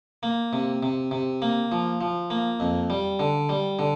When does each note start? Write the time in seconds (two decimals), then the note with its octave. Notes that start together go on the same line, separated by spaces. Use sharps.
0.23 A#3
0.53 C3
0.83 C3
1.11 C3
1.42 A#3
1.72 F3
2.01 F3
2.30 A#3
2.60 F2
2.90 G3
3.19 D3
3.49 G3
3.79 D3